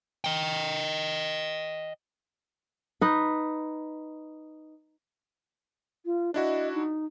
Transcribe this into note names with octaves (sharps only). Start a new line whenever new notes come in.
D#5 G5
D#4 B4
F4
D4 E4 F#4 D#5
D#4